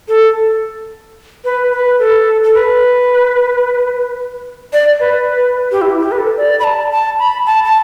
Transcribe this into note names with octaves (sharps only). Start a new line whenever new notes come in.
A4
B4
B4
A4
A4
B4
D5
B4
G4
E4
G4
B4
A4
D5
B5
A5
A5
B5
A5
A5